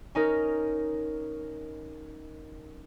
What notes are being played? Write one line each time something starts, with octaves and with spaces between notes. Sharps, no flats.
C#4 D#4 A#4